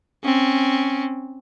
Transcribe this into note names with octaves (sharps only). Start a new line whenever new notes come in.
C4 C#4